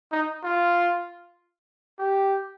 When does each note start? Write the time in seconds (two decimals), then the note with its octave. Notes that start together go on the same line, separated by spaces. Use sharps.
0.12 D#4
0.43 F4
1.99 G4